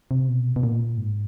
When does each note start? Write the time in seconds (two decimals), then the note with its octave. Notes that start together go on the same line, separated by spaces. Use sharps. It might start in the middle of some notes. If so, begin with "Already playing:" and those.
0.11 C3
0.29 B2
0.56 B2
0.63 A#2
0.97 G#2